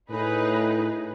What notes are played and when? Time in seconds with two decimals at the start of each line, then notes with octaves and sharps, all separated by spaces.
0.10 A2 D#4 G#4 B4